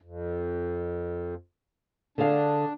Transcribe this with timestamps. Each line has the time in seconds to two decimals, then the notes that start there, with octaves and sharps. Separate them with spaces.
0.02 F2
2.18 D3 D4 G#4 F5